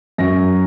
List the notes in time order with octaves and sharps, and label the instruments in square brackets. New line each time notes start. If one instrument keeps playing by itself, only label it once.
[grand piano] F#2 F#3 C#4 A#6